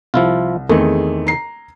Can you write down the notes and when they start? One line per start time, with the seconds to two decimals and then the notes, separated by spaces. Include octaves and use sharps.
0.14 C2 F3 E4 F4
0.69 E2 D#3 A3 C4 G#4
1.27 A#5 C7